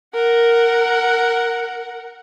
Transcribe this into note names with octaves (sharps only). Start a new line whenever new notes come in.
A#4 F#5